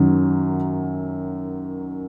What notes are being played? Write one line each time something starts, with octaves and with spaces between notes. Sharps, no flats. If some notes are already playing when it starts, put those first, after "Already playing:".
Already playing: F#2 D#3 F#3